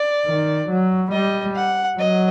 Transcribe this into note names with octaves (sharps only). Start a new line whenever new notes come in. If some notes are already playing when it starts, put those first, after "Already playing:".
Already playing: D5
D#3
F#3
G3 D#5
F#5
F#3 D#5